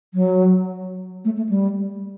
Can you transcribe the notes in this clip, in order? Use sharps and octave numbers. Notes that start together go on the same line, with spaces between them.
F#3
A3
A3
G3